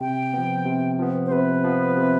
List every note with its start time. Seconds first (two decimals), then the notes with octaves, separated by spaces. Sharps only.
0.01 C3 G5
0.34 F3 B3
0.66 C3
0.99 F3 B3
1.26 C5
1.31 C3 B4
1.64 F3 B3
1.97 C3